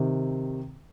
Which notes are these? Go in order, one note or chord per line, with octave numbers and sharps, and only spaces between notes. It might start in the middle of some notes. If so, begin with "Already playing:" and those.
Already playing: C3 D#3